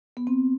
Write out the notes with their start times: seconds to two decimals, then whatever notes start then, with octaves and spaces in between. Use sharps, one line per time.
0.17 B3
0.27 C4